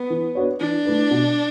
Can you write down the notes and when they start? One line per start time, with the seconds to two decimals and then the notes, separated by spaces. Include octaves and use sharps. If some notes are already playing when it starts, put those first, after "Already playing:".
Already playing: B3
0.10 E3
0.35 B3 D4 F#4 C#5
0.60 E3 D4
0.85 A3 E4 B4
1.11 B2